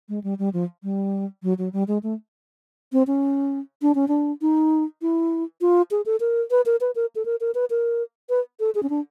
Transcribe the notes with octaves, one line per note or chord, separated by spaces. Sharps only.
G#3
G3
G3
F3
G3
F#3
F#3
G3
G#3
A3
C4
C#4
D4
C#4
D4
D#4
E4
F4
G#4
A4
A#4
B4
A#4
B4
A#4
A4
A#4
A#4
B4
A#4
B4
A4
G#4
C#4
D4